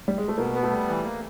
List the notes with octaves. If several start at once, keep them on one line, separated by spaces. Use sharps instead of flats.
G3
G#3
A3
B2 A#3
B3
A3
G3
E3
A#3